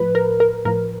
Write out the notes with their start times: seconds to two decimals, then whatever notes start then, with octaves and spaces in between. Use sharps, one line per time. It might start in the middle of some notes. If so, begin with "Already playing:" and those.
Already playing: A2 F3 B4
0.15 A#4
0.40 A#4
0.65 A2 F3 A#4